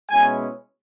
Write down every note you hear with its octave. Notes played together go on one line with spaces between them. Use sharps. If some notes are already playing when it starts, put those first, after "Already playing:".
B2 G#3 C#4 E4 G#5